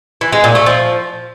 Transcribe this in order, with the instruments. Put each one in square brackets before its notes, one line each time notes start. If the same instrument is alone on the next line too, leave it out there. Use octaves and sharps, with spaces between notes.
[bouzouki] E3
G#3
A#2
A3
F3